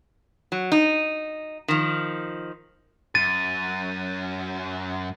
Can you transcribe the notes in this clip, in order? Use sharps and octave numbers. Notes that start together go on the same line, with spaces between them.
F#3
D#4
D#3 F3
F#2 A6 D#7